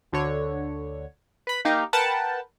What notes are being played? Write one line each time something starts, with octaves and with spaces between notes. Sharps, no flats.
D2 D3 C#5
B4 B5
A#3 D#4 G4 F5
A#4 B4 F#5 G5 A5